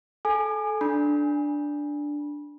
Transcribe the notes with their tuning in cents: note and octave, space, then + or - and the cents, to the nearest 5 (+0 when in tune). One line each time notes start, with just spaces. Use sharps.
A4 -25 G#5 +0 D6 +45
D4 +0 B5 -30